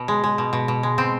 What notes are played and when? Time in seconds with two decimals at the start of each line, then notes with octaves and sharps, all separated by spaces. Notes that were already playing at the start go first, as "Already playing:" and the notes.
Already playing: B2
0.08 G#3
0.24 G#3
0.38 B2
0.53 B2
0.68 B2
0.83 G#3
0.98 B2 C4